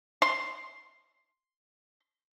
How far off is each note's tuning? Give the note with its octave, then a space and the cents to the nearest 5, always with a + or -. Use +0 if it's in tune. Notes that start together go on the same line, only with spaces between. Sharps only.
C6 +0